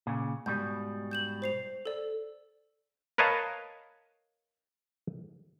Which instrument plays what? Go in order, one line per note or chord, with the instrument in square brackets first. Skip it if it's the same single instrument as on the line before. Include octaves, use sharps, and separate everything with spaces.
[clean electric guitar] A#2 C#3
[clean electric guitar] G#2 B2 G3 [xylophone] G6
[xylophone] G6 E7 F#7
C5 C7 F7
A4 D5
[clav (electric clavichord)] A#4 B4 C#5 D#5 F5 A5